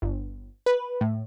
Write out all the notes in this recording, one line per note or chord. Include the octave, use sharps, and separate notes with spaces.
G1
B4
A2